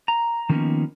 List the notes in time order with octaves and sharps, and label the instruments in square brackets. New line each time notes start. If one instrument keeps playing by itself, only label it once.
[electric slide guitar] A#5
D#3 F3 A#3 B3 C#4 D#4